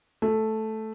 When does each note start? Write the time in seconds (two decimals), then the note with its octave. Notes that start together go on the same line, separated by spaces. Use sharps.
0.22 A3